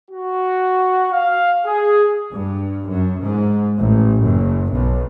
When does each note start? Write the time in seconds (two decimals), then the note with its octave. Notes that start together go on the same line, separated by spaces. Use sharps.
0.10 F#4
1.12 F5
1.66 G#4
2.32 G2
2.88 F#2
3.23 G#2
3.78 A1
4.22 F#1
4.73 B1